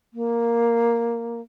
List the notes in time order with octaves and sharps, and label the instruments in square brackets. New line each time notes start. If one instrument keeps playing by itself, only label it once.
[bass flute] A#3